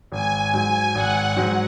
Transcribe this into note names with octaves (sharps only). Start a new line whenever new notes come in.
G#1 G#5
G#2 F#3 G#5
G#1 F#5
G#2 F#3